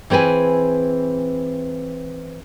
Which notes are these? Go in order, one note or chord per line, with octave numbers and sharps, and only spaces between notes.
E3 C4 G#4 B4 G#5